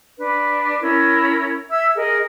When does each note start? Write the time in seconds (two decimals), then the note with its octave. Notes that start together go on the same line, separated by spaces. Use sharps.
0.18 D4 B4
0.80 C#4 E4 A#4
1.69 E5 E6 G#6
1.95 G#4 A#4 D#5